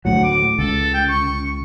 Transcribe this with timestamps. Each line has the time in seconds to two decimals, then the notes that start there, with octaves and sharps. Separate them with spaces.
0.05 D2 A2 F#3 F#5
0.23 D6
0.59 C#2 A4
0.94 G5
1.08 C#6